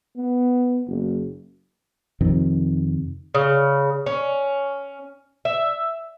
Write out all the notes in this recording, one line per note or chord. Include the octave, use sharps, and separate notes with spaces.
B3
F#1
F2 C3 D#3
C#3
C#4
E5